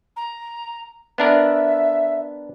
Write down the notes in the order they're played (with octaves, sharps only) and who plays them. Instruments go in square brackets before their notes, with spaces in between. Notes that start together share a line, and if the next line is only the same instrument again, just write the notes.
[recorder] A#5
[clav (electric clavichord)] B3 D4 A#4 [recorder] E5